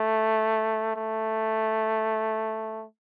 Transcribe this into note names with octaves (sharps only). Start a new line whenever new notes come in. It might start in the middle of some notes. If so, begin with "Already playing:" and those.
Already playing: A3
A3